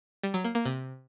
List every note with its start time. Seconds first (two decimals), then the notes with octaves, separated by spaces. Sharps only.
0.23 G3
0.34 F#3
0.44 A#3
0.55 A#3
0.65 C3